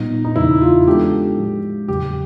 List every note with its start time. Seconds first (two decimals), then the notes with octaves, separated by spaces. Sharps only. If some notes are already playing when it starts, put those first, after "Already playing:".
Already playing: A#2 G3 B3 D#4
0.25 D#4
0.36 E2 C#3 E3 E4
0.62 F4
0.87 G#3 B3 D4 F#4 G4 A4
1.38 A2 F3 G#3
1.88 E2 C#3 F#3 G4